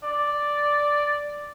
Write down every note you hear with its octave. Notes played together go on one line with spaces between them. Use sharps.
D5